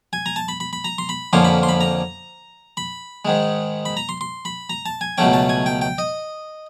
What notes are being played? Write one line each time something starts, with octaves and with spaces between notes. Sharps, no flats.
G#5
A#5
A5
B5
B5
B5
A#5
C6
B5
F2 D3 F3 A#3 C#4 C6
B5
C6
B5
A#5
B5
G#2 D#3 G#3
B5
A#5
C6
C6
B5
A#5
A5
G#5
C#2 B2 F#3 A3 C#4 G5
A5
G#5
G5
G5
D#5